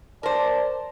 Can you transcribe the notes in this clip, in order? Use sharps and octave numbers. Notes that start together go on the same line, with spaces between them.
A#4 C5 D5 A5